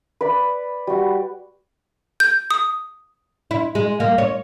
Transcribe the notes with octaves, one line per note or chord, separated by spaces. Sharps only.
B4 D5 B5
G3 F#4
G6
D#6
E4
G#3
A#3
C#5